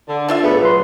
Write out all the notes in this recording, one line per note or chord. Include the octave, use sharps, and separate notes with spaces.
D3
D4 F4 E5
A2 A3 B3 G#4 B4
F#3 B4 C6 C#6